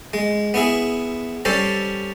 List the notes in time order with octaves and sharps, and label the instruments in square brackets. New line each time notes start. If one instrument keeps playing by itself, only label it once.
[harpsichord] G#3
B3 E4 G#4
G3 C#4 A4 C5